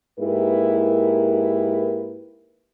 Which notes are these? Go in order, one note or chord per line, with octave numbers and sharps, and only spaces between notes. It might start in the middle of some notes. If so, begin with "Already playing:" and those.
G#2 A#3 E4 G4 A#4 B4